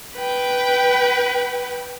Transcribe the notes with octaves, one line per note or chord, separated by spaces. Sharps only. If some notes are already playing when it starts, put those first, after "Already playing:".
B4 G5